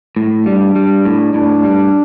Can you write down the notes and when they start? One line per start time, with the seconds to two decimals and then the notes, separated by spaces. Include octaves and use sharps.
0.16 A2
0.46 G3 D4
0.76 G3
1.05 A2
1.34 A2 D4
1.64 G3